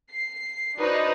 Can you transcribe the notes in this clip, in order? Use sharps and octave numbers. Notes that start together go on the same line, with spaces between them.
C7
D4 D#4 F#4 B4 C5 D#5